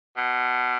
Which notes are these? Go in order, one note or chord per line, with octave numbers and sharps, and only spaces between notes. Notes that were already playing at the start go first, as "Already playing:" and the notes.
B2